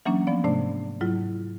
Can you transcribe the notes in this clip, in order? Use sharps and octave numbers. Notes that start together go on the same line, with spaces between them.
E3 F#3 A#3 C#4 D4
F3 A#3 B3 D5
G#2 C3 A3 D4 D5
G#2 F#3 E4 F4